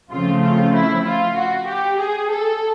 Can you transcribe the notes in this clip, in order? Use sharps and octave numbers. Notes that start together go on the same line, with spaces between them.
C#3 F3 A3 C4 F4
F4
E4
F4
F#4
G4
G#4
A4